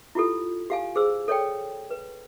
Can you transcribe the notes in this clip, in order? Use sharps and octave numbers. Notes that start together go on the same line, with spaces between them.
E4 F4 G4 A4
G4 F5 G#5
G#4 C5 E6
A4 C#5 D5 G5
B4